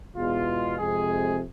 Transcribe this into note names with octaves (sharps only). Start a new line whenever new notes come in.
E2 B2 G#3 F4
F2 C3 G#3 G#4